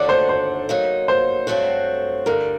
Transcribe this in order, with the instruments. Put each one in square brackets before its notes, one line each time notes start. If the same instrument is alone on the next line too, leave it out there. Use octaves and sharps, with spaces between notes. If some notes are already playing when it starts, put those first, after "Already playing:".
Already playing: [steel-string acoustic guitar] D#2 D3 A3 D#4 F#4 [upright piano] D5
[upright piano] C5
C5
[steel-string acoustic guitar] F#3 A#3 D#4
[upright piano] C5
[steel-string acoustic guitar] G2 F#3 A3 C4 F#4
[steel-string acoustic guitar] G2 D3 G3 [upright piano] A#4